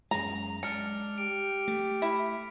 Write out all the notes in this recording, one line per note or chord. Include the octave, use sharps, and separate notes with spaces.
F#2 G#3 A#5 F7
G#3 D4 F6 C#7
G4 D7
A3
E4 B6